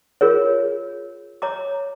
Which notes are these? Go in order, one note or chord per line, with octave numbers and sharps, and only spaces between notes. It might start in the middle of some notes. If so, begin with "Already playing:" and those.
F4 G#4 A#4 C#5
C#5 A#5 D6